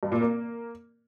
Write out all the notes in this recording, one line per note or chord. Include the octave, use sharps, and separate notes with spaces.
G2
A#2
A#3